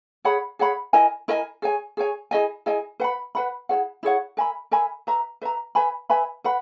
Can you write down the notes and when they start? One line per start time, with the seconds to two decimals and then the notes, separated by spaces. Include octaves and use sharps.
0.25 G#4 C#5 F#5 B5
0.59 G#4 C#5 F#5 B5
0.93 E4 A#4 D#5 G#5
1.28 E4 A#4 D#5 G#5
1.62 G#4 C#5 G#5
1.97 G#4 C#5 G#5
2.31 E4 G#4 D#5 G#5
2.66 E4 G#4 D#5 G#5
3.00 B4 F#5 B5
3.35 B4 F#5 B5
3.69 E4 G#4 C#5 F#5
4.03 E4 G#4 C#5 F#5
4.37 A#4 E5 G#5 B5
4.71 A#4 E5 G#5 B5
5.07 B4 E5 A#5
5.42 B4 E5 A#5
5.75 B4 E5 G#5 B5
6.10 B4 E5 G#5 B5
6.44 B4 F#5 B5